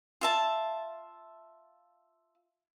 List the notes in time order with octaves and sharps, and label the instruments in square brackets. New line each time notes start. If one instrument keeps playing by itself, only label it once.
[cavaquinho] F4 E5 A5